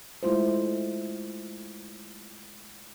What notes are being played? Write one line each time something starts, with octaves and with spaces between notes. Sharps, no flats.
G#3 A3 E4 F4 C5